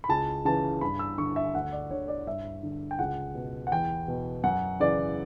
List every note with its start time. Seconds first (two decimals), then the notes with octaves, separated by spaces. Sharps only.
0.04 B5
0.09 C#2 A5
0.45 C#3 E3 A5
0.81 G2 B5
0.99 E6
1.18 D3 C#6
1.36 E5
1.55 D2 F#5
1.72 D5
1.91 D3 C#5
2.08 D5
2.27 G2 E5
2.63 D3
2.91 G5
2.99 C#2 F#5
3.35 B2
3.67 F#5
3.71 E2 G5
4.08 B2
4.44 F#2 F#5
4.80 C#3 E3 D5